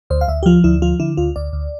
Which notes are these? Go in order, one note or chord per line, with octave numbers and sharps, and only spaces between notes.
D2 C5
F5
D2 E5
G4
F3 F4
D2 E4
F3 F4
D3 E4
D2 F4
D2 D5
D2